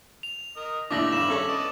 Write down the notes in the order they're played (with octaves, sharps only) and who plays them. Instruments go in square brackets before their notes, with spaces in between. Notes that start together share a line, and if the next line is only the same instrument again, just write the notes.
[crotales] F7
[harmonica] A#4 D#5
[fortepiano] D#2 A2 D4 [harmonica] D3 E5 [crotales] D6 A#6 F#7
[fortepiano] G2 [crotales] E7 F#7
[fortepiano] C#4 A4 C#5
[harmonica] B3 D5 D#5